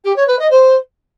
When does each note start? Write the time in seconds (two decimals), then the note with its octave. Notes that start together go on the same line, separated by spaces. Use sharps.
0.04 G4
0.15 C#5
0.27 B4
0.38 D#5
0.50 C5